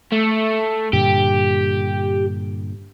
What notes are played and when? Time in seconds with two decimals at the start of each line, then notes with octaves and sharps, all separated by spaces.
0.12 A3
0.93 G2 A#2 D3 G4